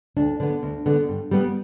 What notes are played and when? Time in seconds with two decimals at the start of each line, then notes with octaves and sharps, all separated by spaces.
0.17 D2 D4
0.40 D3 B3 D4
0.63 D2
0.86 D3 B3
1.09 G2
1.31 G3 B3